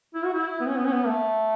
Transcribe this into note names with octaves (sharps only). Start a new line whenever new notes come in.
E4
F#4
E4
B3
C#4
B3
C#4
B3
A3